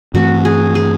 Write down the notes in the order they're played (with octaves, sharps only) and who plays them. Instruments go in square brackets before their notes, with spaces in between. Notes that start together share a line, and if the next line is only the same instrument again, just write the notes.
[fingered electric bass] G2 E3 A3 C4 [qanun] F#4
[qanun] G#4
G#4